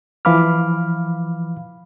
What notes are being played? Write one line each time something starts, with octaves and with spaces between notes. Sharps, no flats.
E3 F3 F5 B5 D6 F6